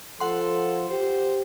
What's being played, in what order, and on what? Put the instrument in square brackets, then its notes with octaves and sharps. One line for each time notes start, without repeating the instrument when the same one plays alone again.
[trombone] F3 [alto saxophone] A4 [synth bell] F#5 C6
[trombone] G4 [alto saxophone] C5